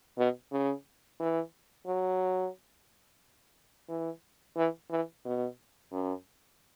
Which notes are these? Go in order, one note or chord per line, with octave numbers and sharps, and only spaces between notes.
B2
C#3
E3
F#3
E3
E3
E3
B2
F#2